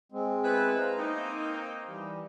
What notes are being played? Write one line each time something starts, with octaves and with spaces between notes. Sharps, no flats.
G#3 C4
B3 E4 B4
C5 F5 A#5
A#3 C4 D#4
E3 G3 G4